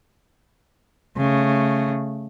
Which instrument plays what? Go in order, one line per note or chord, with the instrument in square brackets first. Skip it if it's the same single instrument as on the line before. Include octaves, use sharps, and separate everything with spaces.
[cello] C#3 A3